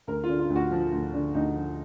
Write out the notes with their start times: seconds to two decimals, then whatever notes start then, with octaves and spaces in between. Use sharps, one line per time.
0.07 D2 A#4
0.24 F4
0.29 D3
0.39 F4
0.50 D2
0.56 F#4
0.71 F3
0.92 D2
1.13 D3
1.34 D2 D#4
1.56 F3